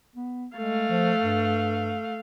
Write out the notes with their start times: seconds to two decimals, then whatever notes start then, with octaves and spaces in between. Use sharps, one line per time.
0.16 B3
0.57 G#3 A3 F5
0.90 F3
1.22 G2